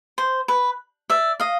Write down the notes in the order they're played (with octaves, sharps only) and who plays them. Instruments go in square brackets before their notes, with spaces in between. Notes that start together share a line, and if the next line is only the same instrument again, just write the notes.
[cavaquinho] C5
B4
D5 E5
D#5 F5